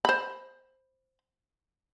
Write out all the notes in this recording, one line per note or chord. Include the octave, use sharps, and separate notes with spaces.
C5 B5